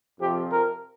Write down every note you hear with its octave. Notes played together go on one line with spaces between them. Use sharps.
F2 C3 F3 C4 G4
A#4